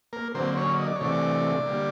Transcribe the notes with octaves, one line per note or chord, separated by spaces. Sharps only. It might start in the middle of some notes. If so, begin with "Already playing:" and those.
A#3 A#4
D3 F#3 A#3 C4 C5
C#4 C#5
D#5
D5
C#5
C3 E3 A3 D4 D5
D3 G3 A#3